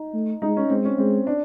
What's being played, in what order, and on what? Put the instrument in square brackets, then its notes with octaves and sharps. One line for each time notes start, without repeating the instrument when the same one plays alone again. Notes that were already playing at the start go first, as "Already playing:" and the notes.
Already playing: [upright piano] D#4
[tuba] A3
[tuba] G#3 [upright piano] D#4
[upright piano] C#4
[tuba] G#3 [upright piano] C4
[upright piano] C#4
[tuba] G#3 [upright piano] C4
[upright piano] D4